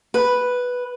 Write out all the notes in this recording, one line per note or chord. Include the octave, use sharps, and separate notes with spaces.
B4